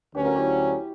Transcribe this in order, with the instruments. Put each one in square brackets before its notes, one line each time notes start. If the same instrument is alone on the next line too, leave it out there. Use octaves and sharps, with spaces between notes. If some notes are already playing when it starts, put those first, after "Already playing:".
[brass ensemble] D2 D3 F#3 C#4 [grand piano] G4 B4
[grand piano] F#4 A#4
E4 G4